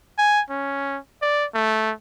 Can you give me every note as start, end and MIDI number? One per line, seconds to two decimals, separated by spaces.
0.18 0.41 80
0.50 0.98 61
1.22 1.45 74
1.55 1.92 57